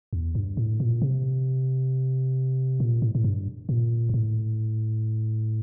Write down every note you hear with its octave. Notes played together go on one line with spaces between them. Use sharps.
E2
G2
A2
A#2
C3
A#2
A2
A2
G2
A#2
G2
A2